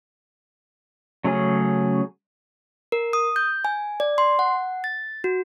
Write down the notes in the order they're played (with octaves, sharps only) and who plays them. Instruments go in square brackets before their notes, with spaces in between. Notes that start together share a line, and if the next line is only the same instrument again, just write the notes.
[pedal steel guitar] C#3 F#3 A3 C#4 G#4
[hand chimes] A#4
D#6
G6
G#5
D5
C6
F#5
A6
F#4